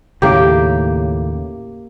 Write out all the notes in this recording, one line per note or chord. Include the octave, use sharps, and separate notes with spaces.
D#2 A2 C#3 A#3 G4